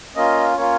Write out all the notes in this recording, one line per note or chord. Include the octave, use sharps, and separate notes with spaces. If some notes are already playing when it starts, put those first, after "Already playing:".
A#3 C#4 F4 D#5
A#3 C#4 F4 C#5